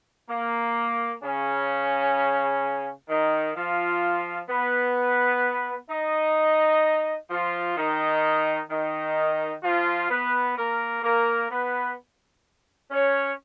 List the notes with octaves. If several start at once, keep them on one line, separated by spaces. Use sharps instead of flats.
A#3
C#3 C#4
D#3 D#4
F3 F4
B3 B4
D#4 D#5
F3 F4
D#3 D#4
D#3 D#4
F3 F4
B3 B4
A#3 A#4
A#3 A#4
B3 B4
C#4 C#5